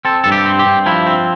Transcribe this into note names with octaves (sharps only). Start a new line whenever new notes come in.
C4 A4
G2 A4
G4
C4
G4
G2
F3 E4
C4